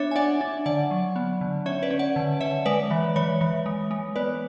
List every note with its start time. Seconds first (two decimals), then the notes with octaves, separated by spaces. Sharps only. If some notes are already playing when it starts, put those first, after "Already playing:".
Already playing: B3 D4 C#5 E5
0.11 G#5
0.16 D4 D5 F#5
0.41 D4
0.66 D3 D5 F#5
0.91 F#3
1.16 B3
1.41 D3
1.66 C#4 C#5 E5
1.83 B4 D5
1.91 C#4
1.99 D5 F#5
2.16 D3
2.41 D3 C#5 E5
2.66 G#3 B4 D5
2.91 E3
3.16 E3 C#5
3.41 E3
3.66 G#3
3.91 G#3
4.16 B3 B4 D5